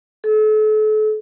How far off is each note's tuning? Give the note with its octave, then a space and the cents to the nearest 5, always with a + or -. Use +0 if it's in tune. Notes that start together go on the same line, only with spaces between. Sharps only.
A4 -40